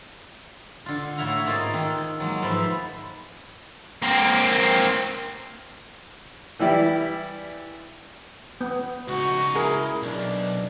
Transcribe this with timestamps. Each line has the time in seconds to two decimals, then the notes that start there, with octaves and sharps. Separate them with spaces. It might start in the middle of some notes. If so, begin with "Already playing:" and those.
0.86 D3 F4
1.18 A2 F#4 C#5 E5 F5 A#5
1.46 G#2 A#3 F4 D#5 G#5 A5
1.74 D#3 A4
2.20 F#3 G#3 A#3
2.42 G#2 F3 B4 E5 B5 C6
4.02 A#3 C4
6.59 E3 G3 E4 G4 D5
8.61 B3
9.08 C#2 D#4 F#4
9.55 E4 G#4 A#4
10.02 B1 D4